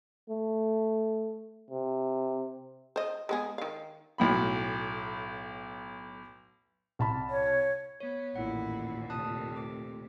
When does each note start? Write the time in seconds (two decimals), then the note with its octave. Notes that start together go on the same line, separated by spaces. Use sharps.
0.29 A3
1.71 C3
2.96 C5 D#5
3.29 G#3 B3 G#4
3.58 D#3 F5
4.18 B1 A2 B5
6.99 C2 A5 B5
7.30 C#5
8.00 B3 C#5
8.36 A1 D#2 A#2 E4 F#5
9.10 C3 A3 A5 D#6 F#6
9.56 D6